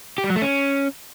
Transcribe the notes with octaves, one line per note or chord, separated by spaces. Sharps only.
G4
G3
F#3
A3
C#4